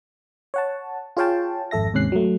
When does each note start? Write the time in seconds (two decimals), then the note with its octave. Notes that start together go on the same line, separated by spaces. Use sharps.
0.54 C#5 F#5 A5
1.17 F4 G#4 C#5 F5 G5 A5
1.71 G#1 F2 A4 E5 A#6
1.94 D#2 G#2 C3 C#4 F#6 C7
2.12 F#3 A3